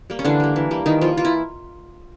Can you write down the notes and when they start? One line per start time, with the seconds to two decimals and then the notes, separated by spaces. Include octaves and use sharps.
0.10 G3 A#3
0.19 C#4
0.25 D3 E3 D4
0.40 G3 A#3
0.56 E3
0.71 G3 A#3
0.86 D#3 E3 D#4
1.01 F3 G3 A#3 F4
1.17 E3 F4
1.25 E4